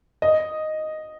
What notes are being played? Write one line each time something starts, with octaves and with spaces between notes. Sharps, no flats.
D#5